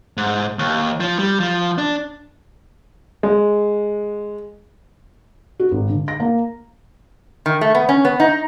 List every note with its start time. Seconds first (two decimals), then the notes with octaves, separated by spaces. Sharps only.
0.17 G#2
0.59 D#2
1.00 F3
1.19 G3
1.40 F3
1.78 D4
3.23 G#3
5.60 F#4
5.72 G#1
5.89 D3
6.08 A#6
6.20 A#3
7.46 D#3
7.61 A3
7.75 B3
7.89 C#4
8.05 B3
8.20 D#4